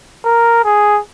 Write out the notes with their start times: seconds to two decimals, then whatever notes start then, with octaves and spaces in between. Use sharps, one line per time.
0.25 A#4
0.65 G#4